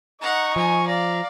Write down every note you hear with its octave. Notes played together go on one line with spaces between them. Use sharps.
D#4 F#5 A#5 C#6
F3 G#5 A#5
D5 F5 A#5